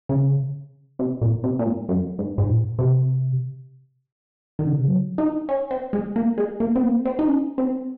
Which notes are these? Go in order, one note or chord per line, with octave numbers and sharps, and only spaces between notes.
C#3
C3
A#2
C3
A#2
G#2
F#2
G#2
G#2
A#2
C3
D#3
C#3
C3
C#3
F#3
D#4
C#4
C4
G#3
A#3
G#3
A#3
C4
A#3
C4
D#4
C#4
C4